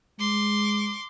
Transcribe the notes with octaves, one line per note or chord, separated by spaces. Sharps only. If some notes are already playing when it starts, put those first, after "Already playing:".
G#3 C6 D6